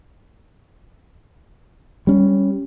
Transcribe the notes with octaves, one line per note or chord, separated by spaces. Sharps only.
G3 C#4